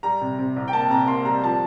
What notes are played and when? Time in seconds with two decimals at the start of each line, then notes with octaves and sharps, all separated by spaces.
0.03 G3 A#5
0.21 C3
0.39 C3
0.56 C2
0.68 G5
0.73 A#3 A5
0.90 C3 A#5
1.08 A#3 C6
1.25 G3 A#5
1.43 F3 A5